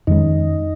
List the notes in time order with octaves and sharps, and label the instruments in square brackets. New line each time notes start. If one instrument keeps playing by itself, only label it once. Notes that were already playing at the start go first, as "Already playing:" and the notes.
[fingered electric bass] F2 D#3 G#3 C#4 [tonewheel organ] D#4